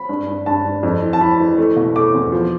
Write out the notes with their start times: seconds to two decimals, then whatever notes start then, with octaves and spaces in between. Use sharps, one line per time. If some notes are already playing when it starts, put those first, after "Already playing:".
Already playing: B5
0.09 G2
0.27 G2
0.46 G2 A5
0.65 G2
0.83 F2
1.02 E3
1.13 A5
1.21 E3 B5
1.40 E3
1.58 A3
1.76 B2
1.96 A3 D6
2.14 E2
2.32 F3